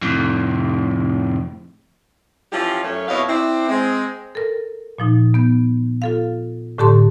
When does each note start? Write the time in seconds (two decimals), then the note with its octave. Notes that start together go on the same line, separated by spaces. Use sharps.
0.02 F2 A2
2.53 E3 F3 C#4 F4 G4
2.83 F#2 A3 C#5
3.09 F2 B2 E4 C#5 D#5 F5
3.28 C4 D4 E4
3.68 G#3 C4
4.35 A4 A#4
4.99 A#2 F3 D#4
5.34 B3 G6
6.02 F4 A4 F5
6.78 A2 D3 G4 A4 A5 C6